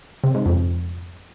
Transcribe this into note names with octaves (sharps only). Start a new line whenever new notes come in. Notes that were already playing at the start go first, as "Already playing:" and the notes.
C3
G#2
F2